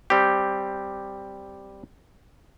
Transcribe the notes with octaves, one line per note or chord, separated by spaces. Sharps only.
G3 C4 G4